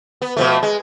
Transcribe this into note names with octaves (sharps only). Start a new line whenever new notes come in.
B3
B2 F3 A3
G#3